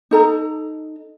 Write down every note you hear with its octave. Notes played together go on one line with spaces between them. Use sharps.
D#4 A4 A#5